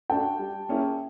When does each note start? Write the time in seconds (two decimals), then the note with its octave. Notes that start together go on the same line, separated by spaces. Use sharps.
0.10 A3 D4 F#4 G5 A5
0.39 G3
0.69 A#3 C#4 E4 G#4